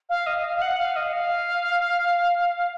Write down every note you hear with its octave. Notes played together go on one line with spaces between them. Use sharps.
F5
D#5
F5
F5
F#5
F5
D#5
F5